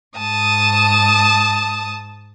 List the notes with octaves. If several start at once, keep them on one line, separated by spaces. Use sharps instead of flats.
G#2 A5 D#6